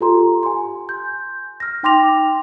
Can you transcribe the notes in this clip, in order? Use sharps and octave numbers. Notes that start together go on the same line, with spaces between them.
F4 G4 A4 A#5 C6
G#5 C6
G6
F6 A#6
D#4 G5 C6 D6 A#6 F7